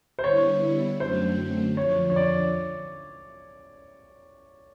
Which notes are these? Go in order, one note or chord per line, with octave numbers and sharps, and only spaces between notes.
C5
D3 G3 B3 E4 C#5
F#2 D3 F#3 A3 C4 C5
F2 D3 F3 C#5
C#5
D5